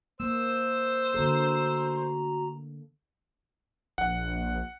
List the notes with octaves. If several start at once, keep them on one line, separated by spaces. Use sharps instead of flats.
A#3 C5 E6
D3 A#3 F#4 A4 A#5
A#1 F#5